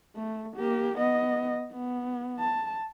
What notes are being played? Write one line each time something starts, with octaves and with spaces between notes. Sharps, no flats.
A3
A#3 G4
B3 D#5
B3
A5